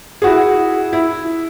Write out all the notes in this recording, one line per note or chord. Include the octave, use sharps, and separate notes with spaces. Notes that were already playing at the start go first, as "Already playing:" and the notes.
E4 F#4 G#4
E4